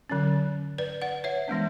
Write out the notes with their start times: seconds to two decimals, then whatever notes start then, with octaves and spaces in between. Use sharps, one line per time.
0.10 D3 F#3 C#4
0.78 B4 D5
1.02 D5 F#5
1.24 C#5 E5
1.48 E3 G#3 B3 D4